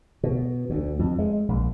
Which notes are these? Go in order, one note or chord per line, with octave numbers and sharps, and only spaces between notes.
B2
D2
F2
G#3
A#1